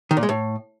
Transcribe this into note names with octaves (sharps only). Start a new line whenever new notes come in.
D#3
A#2
G#3
A2